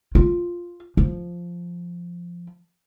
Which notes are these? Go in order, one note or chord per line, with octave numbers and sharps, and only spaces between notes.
F4
F3